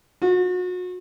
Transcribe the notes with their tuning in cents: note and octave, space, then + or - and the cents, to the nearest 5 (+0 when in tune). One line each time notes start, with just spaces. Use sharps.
F#4 -35